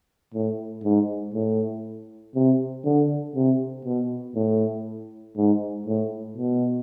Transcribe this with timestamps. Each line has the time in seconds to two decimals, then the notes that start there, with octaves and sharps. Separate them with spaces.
0.34 A2
0.84 G#2
1.34 A2
2.35 C3
2.84 D3
3.36 C3
3.85 B2
4.35 A2
5.37 G#2
5.87 A2
6.37 B2